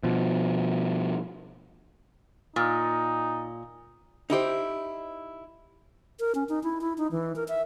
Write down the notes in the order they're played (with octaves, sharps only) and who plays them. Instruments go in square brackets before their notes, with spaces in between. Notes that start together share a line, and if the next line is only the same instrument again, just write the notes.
[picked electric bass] B2 F3
[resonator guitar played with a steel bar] A#2 [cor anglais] D#4
[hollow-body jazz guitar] D#4 E4 G4 C5
[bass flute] A#4
C#4
D#4
E4
E4
D#4
E3
A#4
E5